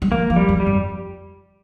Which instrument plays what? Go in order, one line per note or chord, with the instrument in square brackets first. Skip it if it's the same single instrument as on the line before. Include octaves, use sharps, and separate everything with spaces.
[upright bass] G3
[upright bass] F3 [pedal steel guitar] A#3
[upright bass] F3
[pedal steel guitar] G3
[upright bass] G2
[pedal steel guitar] G3
[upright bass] F2